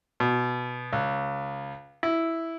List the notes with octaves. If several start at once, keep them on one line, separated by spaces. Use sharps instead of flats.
B2
C#2
E4